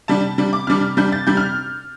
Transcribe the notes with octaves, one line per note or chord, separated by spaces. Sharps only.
C3 G3 D4 A5
C3 G3 D4
D6
C3 G3 D4 F6
C3 G3 D4 G6
A6
C3 G3 D4 G6
F6